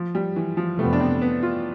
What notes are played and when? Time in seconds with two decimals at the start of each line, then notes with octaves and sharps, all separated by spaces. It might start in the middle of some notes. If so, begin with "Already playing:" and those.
Already playing: F3
0.15 G3
0.36 E3
0.57 F3
0.78 F2 C3 G3 A3 B3
0.93 D4
1.00 C4
1.22 B3
1.43 F4